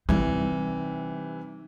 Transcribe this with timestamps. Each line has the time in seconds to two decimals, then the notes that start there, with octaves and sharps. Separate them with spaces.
0.09 C3 E3 G3 D#4